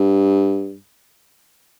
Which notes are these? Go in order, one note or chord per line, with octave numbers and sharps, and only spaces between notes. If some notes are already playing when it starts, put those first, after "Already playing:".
Already playing: G2